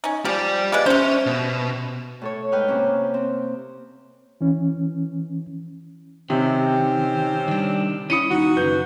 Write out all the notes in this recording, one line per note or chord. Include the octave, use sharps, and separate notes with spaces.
C#4 D#4
F3 G4 D5
G#3 B3 F4 D5
C3 C#4 C5
B2
A2 A4 C#5
G#2 B4 G5 D#6 F6 F#6
C3 A#3 C#4
C4
E3 C#4
C3 D#3 C4 C#4 G4
D#3 G3 D4
C#4 E4 D#6 C#7 D#7
D#2 D#4 F#4
F#2 C#3 B4 G6